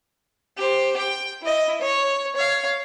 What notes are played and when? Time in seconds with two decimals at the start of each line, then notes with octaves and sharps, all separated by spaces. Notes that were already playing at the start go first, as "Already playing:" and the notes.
0.58 G4 C5
0.99 G5
1.42 E4 D#5
1.81 C#5
2.35 C#5 F5